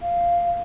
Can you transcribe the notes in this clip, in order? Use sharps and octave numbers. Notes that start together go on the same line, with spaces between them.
F5